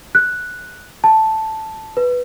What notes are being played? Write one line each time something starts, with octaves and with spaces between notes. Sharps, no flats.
F#6
A5
B4